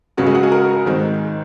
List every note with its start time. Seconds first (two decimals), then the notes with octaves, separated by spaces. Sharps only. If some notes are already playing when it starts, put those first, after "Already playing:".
0.17 C#2 C#3 F#3 C#4 F#4
0.26 G#3 G#4
0.35 F#4 F#5
0.43 G#4 G#5
0.52 A#4 A#5
0.86 G#2 D#3 G#3 C4